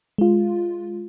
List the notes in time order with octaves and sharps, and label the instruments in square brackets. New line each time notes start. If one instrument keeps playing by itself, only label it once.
[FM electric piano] G#3 F4